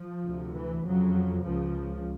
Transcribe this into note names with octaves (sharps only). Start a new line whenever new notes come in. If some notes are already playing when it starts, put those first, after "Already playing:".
Already playing: F3
D2 C3
E3
F2 C#3 F#3
C#2 C#3 F3